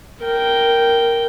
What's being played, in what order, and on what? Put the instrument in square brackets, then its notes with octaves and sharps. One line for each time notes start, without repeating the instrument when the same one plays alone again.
[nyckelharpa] A#4 G5